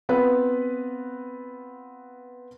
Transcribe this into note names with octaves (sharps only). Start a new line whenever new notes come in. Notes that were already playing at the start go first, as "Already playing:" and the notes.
B3 C4 F4 B4 B5